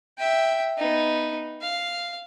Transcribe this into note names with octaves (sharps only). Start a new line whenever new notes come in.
E5 G5
B3 D#4
F5